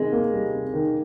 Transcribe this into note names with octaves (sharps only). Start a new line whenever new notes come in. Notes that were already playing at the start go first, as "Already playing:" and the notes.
Already playing: C3 D#3 G#3
A#3
G3
C3
D#3